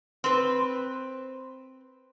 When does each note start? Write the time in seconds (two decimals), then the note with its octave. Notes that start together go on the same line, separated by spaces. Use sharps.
0.24 C4 B4